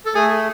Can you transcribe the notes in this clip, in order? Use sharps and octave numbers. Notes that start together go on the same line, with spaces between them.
A4
A3 G#4